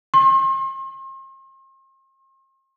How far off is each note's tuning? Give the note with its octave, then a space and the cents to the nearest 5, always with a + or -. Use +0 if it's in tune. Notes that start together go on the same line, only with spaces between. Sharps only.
C6 +45